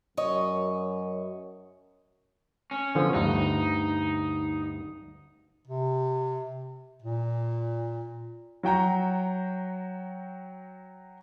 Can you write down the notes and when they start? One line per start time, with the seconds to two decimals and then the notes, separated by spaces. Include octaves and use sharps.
0.17 F#2 C#5 D#5
2.71 C#4
2.95 D3 F3 B3
3.14 D2 G2 D#4
5.67 C3
7.02 A#2
8.63 F#3 F#4 G5 A#5